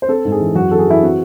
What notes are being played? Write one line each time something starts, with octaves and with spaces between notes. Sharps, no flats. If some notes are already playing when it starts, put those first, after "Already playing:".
C5
C4 A4
G#2
G#4
E3
F#2 F#4
E3 A4
G#4
E3 E4
C4 F#4